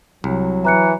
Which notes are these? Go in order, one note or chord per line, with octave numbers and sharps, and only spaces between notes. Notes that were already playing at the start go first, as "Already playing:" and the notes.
C2 F#3
E3 A#5 F#6 C#7